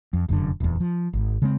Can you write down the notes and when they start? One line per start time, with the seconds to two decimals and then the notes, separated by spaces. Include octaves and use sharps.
0.13 F2
0.29 F1 F#2 B2 D3
0.60 D#1 E2
0.80 F3
1.13 G#1
1.42 C#3 G#3 C4